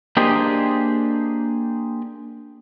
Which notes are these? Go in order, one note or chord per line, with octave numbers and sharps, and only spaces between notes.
A#3 D4 G4 G#4 C5 D#5